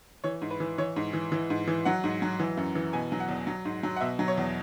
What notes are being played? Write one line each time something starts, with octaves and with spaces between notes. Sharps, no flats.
E3 C#5
G#2
B4
E3
E3 C#5
G#2
E3
E3
G#2
E3
F#3 F#5
G#2
F#3
E3
F#2
E3
B2 G#5
F#3
F#5
E2
F#3
G#2
F#3
F#5
B2 E5
F#3
C#5
E2